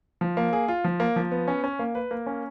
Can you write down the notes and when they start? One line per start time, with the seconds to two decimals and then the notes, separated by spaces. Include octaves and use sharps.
0.21 F3
0.37 A#3
0.53 G#4
0.68 F4
0.84 F3
1.00 A#3
1.16 F3
1.32 B3
1.48 C#4
1.64 C#4
1.79 A#3
1.95 B4
2.11 A#3
2.26 C#4